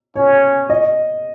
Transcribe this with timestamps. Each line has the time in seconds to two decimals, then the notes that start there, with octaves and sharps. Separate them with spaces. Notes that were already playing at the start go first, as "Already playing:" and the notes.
0.16 C#4 C#5
0.70 D#5